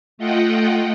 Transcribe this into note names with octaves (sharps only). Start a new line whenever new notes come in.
A3 F4 D#5 F#5 G5